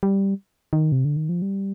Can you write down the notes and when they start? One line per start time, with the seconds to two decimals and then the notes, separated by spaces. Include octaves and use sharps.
0.03 G3
0.73 D#3
0.92 C3
1.05 D3
1.17 D#3
1.29 F3
1.42 G3